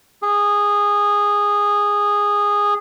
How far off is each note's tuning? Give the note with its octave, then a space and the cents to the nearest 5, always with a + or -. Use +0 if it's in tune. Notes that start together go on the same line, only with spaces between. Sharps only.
G#4 -15